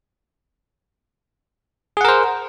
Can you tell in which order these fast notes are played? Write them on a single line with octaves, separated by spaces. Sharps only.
G#4 F#5 A#4 C5